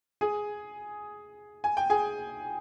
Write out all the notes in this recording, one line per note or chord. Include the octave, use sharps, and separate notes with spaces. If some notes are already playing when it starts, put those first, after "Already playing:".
G#4 G#5
G#5
G5
G#4 G#5